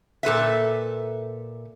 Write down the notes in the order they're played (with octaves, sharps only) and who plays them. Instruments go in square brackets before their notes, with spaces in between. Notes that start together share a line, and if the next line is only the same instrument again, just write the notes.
[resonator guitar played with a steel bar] A#2 A4 B4 E5